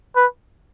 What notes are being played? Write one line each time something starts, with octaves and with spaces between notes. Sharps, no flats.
B4